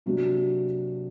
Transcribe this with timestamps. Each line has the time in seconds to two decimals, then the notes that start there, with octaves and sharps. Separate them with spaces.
0.06 C3 F#3 A#3 D4 F#4